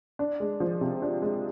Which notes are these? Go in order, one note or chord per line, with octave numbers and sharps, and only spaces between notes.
D4
G#3
F3
C3
D4
G#3